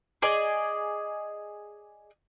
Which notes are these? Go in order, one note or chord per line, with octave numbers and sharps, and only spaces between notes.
G#4 D5 D#5